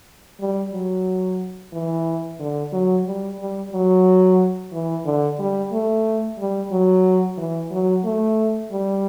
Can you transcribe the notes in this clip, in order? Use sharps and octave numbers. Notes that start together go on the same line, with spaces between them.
G3
F#3
E3
D3
F#3
G3
G3
F#3
E3
D3
G3
A3
G3
F#3
E3
F#3
A3
G3